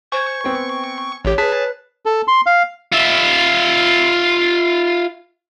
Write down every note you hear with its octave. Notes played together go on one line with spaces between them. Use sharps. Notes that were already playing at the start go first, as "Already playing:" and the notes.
C5 G#5 C#6 G#6
B3 C4 G5
A1 G4 C#5
G#4 B4 A5 F#6 B6
A4
C6
F5
F4 E5